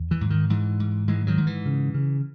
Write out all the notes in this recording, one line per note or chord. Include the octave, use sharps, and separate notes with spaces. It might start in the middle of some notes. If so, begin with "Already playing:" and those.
Already playing: E2
E3
G#2
D#3
G#2 E3
G#2
G#2 E3 G#3
D#3 F#3
G#2
E3
C#3
C#3